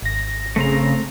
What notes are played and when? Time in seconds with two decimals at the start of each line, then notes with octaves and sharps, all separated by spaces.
0.02 G#1 A#6
0.56 C#3 A3 C4 A#5